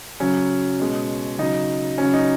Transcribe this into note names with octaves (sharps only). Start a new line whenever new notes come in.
C#3 F#3 C#4
B2 G#3
C#3 F#3 D#4
C#3 F#3 C#4
D#4